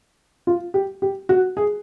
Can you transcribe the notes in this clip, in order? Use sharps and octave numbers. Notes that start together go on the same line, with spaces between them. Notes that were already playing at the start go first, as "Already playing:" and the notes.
F4
G4
G4
F#4
G#4